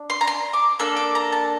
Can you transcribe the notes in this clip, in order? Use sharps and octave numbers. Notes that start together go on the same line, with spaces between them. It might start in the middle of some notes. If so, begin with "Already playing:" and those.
Already playing: D4
C6
A#5
C6
D6
A#3 D4 A4 E6
D6
A#5
A5